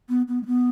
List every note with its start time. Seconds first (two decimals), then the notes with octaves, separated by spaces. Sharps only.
0.09 B3
0.28 B3
0.43 G#3
0.46 B3